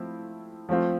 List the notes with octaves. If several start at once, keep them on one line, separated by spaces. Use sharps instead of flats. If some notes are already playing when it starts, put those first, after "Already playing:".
Already playing: F3 A3 C4 E4
F3 A3 C4 F4